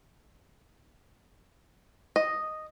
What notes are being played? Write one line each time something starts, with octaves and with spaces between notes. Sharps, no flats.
D#5